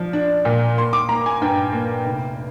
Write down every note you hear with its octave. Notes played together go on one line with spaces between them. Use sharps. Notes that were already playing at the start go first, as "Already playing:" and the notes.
Already playing: F3 D4
D4
A#2
A#3 C6
D6
A#3 A#5
G#5
G2 G5
A#3
F1